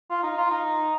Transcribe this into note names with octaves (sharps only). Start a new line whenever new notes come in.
F4
D#4
F4
D#4